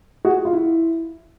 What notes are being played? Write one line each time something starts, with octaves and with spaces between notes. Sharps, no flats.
F#4 G#4
F4
E4